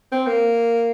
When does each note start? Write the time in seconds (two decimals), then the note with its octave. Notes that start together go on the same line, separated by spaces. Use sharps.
0.12 C4
0.27 A#3